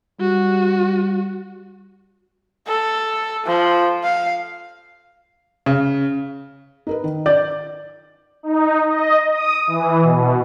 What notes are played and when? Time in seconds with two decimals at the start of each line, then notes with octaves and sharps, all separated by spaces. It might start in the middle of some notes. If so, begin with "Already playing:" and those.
0.20 G3 F#4
2.67 A4
3.46 F3
4.04 F5
5.66 C#3
6.87 D#4 A#4 B4
7.04 D#3
7.26 D5 G6
8.43 D#4
8.86 D#5
9.31 D#6
9.67 E3
10.02 B2